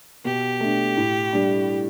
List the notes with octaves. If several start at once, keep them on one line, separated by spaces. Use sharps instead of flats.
B2 G4
A3 D4
A2
G3 D4